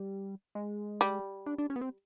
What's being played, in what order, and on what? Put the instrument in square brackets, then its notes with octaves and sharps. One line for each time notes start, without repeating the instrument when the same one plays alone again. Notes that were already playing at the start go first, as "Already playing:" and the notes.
Already playing: [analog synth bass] G3
G#3
[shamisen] G3
[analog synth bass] D4
D4
C#4
B3
C4